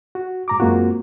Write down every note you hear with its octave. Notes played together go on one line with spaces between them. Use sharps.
F#4
G#2 A#5 D6
F#2 G#3 A#3 C4 F4 F#4